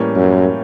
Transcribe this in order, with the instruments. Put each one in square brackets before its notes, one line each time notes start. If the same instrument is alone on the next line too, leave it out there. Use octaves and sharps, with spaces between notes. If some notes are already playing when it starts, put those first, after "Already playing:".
Already playing: [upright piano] A2 E3 G3 A#3 C#4
[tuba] F#2